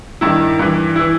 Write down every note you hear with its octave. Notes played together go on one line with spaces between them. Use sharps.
G2 D#3 E4
G2 E3
E3 E4